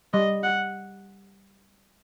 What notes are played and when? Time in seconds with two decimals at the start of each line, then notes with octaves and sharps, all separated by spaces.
0.13 G3 D#5
0.43 F#5